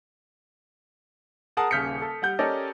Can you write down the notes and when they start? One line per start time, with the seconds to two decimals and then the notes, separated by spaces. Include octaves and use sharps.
1.57 G#4 A#4 F#5 G#5 A5 D#6
1.71 D#1 C#3 F6 G6 B6 C#7
2.02 A4
2.22 G3 F#5 G6
2.39 C#4 G4 A4 A#4 D5 D#5